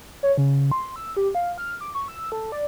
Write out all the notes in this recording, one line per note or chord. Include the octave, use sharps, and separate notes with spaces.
C#5
C#3
C6
E6
G4
F5
F6
D6
C#6
E6
A4
D5